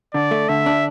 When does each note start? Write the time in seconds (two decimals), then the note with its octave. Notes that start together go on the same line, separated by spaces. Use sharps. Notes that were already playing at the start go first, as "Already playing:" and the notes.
0.14 D3 D5
0.31 A3
0.49 D3 E5
0.66 D4